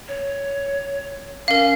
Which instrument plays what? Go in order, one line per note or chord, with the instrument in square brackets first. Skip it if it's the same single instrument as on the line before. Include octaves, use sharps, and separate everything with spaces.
[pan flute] C#5
[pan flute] C#4 [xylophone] A#4 F5